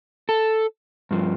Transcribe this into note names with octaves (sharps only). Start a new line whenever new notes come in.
A4
G2 F3